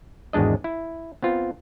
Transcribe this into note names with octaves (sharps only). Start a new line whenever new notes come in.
G#1 E2 G#3 D4 D#5
E4
B3 C4 F4